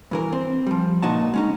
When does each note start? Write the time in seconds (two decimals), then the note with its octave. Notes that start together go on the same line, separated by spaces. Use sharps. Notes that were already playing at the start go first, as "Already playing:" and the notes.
0.11 G2 E3 A#4
0.33 C4
0.66 F3 G3
1.02 C#2 A#2 D#4 F#4 A5
1.34 G#3 C#4 D#4